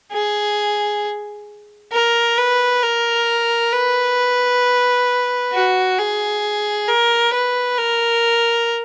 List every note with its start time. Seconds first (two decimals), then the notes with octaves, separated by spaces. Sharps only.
0.12 G#4
1.92 A#4
2.39 B4
2.83 A#4
3.73 B4
5.53 F#4
5.99 G#4
6.88 A#4
7.34 B4
7.78 A#4